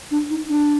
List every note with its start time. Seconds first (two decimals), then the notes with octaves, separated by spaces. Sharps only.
0.11 D4
0.30 D#4
0.49 D4